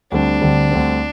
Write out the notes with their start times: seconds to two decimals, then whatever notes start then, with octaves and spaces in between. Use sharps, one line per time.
0.12 D2 D3 G3 C4 D4
0.42 D2 D3 G3 C4
0.71 D2 D3 G3 C4